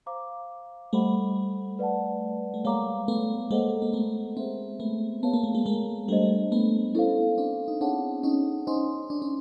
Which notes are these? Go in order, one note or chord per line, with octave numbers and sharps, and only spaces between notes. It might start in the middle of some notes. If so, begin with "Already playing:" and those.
C5 F5 A#5 D6
G3 A3 A4 C5 D#5 F#5 B5
B4 D5 F#5 A5
A3
G#3 A#3 C#5 F5 A#5 D6
A3 B3
G#3 A#3 A4 C5 D#5 F#5
A#3
A3 B3
A#3 C4 G#4 C5 E5
A3 B3
B3 G#4 C#5 F5 A5
A#3
A3
G#3 A#3
G#3 A#3
G3 A3 D4 G4 C5 D#5
A3 B3
B3 C#4 E4 A4 C5 F5
C4 D4
D#4
C4 D4 G#4 C#5 F#5 A5
C#4 D#4
C#4 D#4 C5 D#5 G#5 C6
D4
C#4